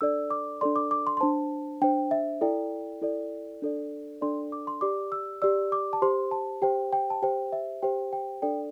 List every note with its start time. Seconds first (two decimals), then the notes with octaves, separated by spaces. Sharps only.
0.01 D4 A4 D5 E6
0.30 D6
0.61 D4 A4 D5 C6
0.76 D6
0.91 D6
1.07 C6
1.17 C6
1.21 D4 C5 A5
1.82 D4 C5 G5
2.11 E5
2.41 E4 A4 D5 G5
3.02 E4 A4 D5
3.62 D4 A4 D5
4.21 D4 A4 D5 C6
4.52 D6
4.67 C6
4.81 G4 D5 D6
5.12 E6
5.42 G4 D5 E6
5.72 D6
5.93 A5
6.02 G4 C5 C6
6.31 A5
6.62 G4 C5 G5
6.93 G5
7.10 A5
7.22 G4 C5 G5
7.52 E5
7.82 G4 C5 G5
8.13 G5
8.42 D4 A4 D5 G5